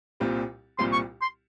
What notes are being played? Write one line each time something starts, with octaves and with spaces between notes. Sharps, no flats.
C2 A#2 G3 C4 F4
C2 A#2 G3 C4 F4 C6
C#6
C6